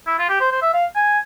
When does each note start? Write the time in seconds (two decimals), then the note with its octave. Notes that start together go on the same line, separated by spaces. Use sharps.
0.07 E4
0.19 F4
0.29 G4
0.40 C5
0.52 C5
0.62 E5
0.73 F5
0.95 G#5